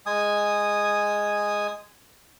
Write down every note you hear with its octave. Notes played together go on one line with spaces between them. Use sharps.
G#3 G#5 D#6